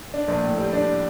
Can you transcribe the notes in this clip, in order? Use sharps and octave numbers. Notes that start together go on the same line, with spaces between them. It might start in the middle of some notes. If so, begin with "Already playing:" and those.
D4
A#1
A2
G3
D4